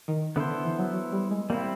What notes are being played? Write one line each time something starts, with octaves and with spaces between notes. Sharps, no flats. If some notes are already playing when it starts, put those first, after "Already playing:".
D#3
D3 B3 E4 A4 C5
D3
E3
F#3
F#3
G3
G#3
G3 A#3 C4 E4